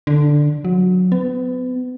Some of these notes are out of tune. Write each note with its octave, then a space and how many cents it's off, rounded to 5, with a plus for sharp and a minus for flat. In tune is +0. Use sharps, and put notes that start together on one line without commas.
D3 +5
F#3 -20
B3 +35